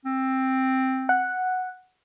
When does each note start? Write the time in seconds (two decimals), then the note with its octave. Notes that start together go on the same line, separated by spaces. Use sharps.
0.05 C4
1.09 F#5